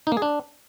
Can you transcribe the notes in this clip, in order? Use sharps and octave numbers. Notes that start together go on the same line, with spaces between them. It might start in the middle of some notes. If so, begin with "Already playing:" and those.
D#4
A#3
G#4
D4